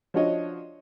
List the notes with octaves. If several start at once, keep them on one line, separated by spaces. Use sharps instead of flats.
F3 D4 F#4 C#5 D#5